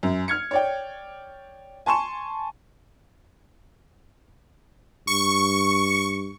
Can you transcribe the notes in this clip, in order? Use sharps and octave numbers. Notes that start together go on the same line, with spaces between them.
F#2
F6 G#6 C#7
C#5 D5 G5
G#5 A5 C6 C#6 E7
G2 C#6